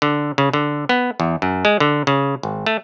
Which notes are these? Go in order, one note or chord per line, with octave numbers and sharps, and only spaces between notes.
D3
C#3
D3
B3
E2
F#2
G#3
D3
C#3
G#1
A3